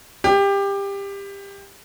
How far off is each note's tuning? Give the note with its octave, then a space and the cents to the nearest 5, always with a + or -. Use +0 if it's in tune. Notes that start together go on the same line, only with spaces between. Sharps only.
G4 +20